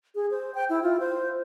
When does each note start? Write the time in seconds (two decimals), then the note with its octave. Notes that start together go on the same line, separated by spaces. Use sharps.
0.15 G#4
0.31 C5
0.55 G5
0.70 E4
0.83 F4
1.00 C5